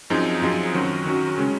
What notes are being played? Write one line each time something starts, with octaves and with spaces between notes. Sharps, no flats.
F#2 F3 C4 D#4 G#4
F#2 F3 C4 D#4 G#4
D#3 F#3 C#4 F#4
D#3 F#3 C#4 F#4
C#3 G#3 C#4